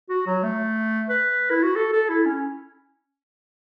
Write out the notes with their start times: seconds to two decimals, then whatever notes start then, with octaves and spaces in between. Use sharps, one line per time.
0.09 F#4
0.27 F#3
0.43 A3
1.09 B4
1.51 E4
1.63 F#4
1.76 A4
1.93 A4
2.09 E4
2.25 C#4